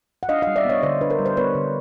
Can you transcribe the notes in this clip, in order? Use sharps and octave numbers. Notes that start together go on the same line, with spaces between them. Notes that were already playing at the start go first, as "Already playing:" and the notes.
F#5
D4 D#5 F5
D#5 F5
G3
D5 E5
B3 C#5 D#5
D3 C5 D5
D4 B4
A#4 C5
G3
C5
B3 B4 C#5
D3